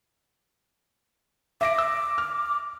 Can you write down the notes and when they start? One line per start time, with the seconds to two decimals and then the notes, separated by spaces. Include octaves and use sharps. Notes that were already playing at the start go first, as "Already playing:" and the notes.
1.61 E5 D6 A#6 D7
1.78 E6
2.18 F6